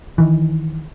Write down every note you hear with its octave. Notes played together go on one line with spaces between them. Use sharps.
D#3 E3